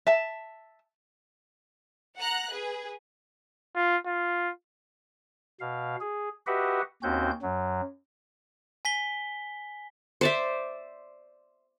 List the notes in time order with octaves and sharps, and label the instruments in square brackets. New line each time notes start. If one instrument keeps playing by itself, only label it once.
[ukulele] E5 A5
[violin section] F#5 A#5 F#6
G#4 B4
[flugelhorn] F4
F4
[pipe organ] B2 F5
G#4
F#4 G4 B4 D#5 E5 F#5
D#2 C4 C#4 F#4 G6
F#2 F#3
[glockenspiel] G#5 B6 G7
[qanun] C5 D5 E5